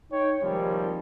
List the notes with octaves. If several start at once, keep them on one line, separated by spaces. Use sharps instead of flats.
D#4 C#5 G5
C3 D#3 F3 G3 G#3 A#3